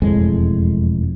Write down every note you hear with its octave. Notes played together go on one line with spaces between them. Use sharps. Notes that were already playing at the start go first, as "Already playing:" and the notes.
E1 F2 A2 G#3